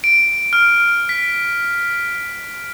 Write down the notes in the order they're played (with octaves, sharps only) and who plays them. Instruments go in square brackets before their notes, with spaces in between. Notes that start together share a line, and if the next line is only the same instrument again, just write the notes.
[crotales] D7
F6
B6